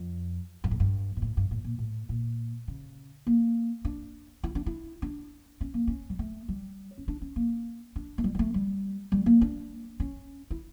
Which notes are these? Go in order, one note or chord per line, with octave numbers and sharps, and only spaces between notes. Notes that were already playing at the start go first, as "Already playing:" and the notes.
Already playing: F2
G2
A2
G2
A#2
A2
G2
A2
A#2
A2
A#2
C#3
A#3
D4
E4
D4
E4
D4
C#4
A#3
C#4
G3
A3
G3
C#4
D4
C#4
A#3
D4
A3
G3
G3
A3
G3
G3
A#3
D4
C#4
E4